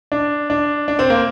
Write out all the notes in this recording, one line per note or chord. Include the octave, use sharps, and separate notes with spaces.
D4
D4
D4
C4
A#3